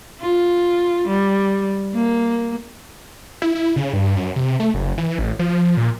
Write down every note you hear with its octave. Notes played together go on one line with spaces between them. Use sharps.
F4
G3
A#3
E4
E4
C#3
G2
F#2
C3
A3
F#1
E3
A1
F3
A#2